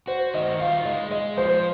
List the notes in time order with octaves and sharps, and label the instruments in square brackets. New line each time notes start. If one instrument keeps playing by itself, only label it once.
[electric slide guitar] F#4 [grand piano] C5
[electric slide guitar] D#3 [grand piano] D#5
[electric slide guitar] F4 [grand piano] F5
[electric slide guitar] G#3 [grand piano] D#5
[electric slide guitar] G#3 [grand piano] D#5
[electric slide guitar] F3 [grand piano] C5